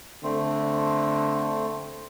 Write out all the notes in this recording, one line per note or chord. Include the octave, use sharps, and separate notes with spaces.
D3 A3 C4